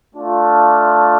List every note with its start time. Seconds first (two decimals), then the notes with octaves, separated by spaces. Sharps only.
0.14 A3 D4 F4